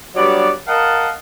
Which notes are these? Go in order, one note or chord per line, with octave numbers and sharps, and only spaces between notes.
G2 F#3 G3 B3 D5
A#4 D#5 F5 F#5 A5